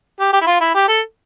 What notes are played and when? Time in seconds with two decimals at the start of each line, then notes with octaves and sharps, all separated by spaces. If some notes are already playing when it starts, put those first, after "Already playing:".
0.20 G4
0.33 G4
0.41 E4
0.47 F4
0.61 E4
0.75 G4
0.88 A4